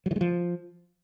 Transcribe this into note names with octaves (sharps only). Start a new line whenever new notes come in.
F#3
E3
G#3
F3